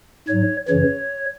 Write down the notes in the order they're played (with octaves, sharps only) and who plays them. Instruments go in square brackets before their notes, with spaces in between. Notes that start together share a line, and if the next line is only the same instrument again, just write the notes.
[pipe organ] G#2 F#3 C#5
F#2 C#3 E3 C#5